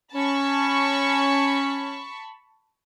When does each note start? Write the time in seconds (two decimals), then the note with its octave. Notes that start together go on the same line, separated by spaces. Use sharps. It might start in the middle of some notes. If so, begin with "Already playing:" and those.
0.14 C#4 A5 B5 C#6